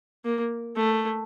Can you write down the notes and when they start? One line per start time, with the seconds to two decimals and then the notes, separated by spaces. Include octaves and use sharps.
0.25 A#3
0.76 A3